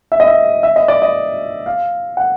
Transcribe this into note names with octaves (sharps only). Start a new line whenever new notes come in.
E5
D#5
E5
E5
D#5
D5
D#5
F5
F#5